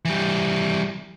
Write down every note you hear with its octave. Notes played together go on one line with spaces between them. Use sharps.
E3 G3